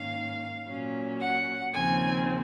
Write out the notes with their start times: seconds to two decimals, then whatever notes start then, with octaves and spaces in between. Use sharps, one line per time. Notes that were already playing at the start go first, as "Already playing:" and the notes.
Already playing: G#2 D#3 A#3 C#4 F5
0.67 A#2 F#3 C#4
1.20 F#5
1.74 D#2 C#3 F3 C4 G#5